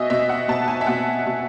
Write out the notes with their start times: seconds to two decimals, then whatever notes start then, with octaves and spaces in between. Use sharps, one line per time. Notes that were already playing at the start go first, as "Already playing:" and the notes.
Already playing: B2 D#5 E5 G#5
0.10 B2 E5
0.29 F#5
0.48 B2 A5
0.68 G#5
0.81 E5
0.87 B2 F#5
1.26 B2